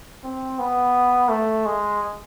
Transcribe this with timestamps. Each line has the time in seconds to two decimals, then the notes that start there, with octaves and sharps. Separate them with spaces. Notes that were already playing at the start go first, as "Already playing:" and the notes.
0.23 C4
0.59 B3
1.29 A3
1.66 G#3